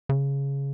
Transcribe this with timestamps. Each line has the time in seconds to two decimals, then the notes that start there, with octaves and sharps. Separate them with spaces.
0.09 C#3